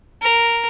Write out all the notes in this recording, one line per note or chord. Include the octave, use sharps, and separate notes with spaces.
A#4